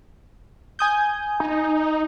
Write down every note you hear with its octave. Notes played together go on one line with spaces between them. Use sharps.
G#5 D#6 G6
D#4